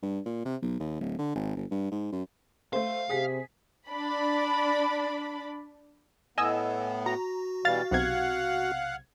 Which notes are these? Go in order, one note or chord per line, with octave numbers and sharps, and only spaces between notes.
G2
A#2
C3
B1
D#2
D1
D3
G#1
G1
G2
G#2
F#2
A3 C5 F5
C3 G#4 B6
D4 D5 B5
A2 B3 D#5 G#5 E6
F#4 A#5
B2 E3 G3 F5 A6
B1 C3 F5 F#5 G#6